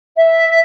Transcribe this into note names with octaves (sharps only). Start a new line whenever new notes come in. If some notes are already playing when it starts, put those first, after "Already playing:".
E5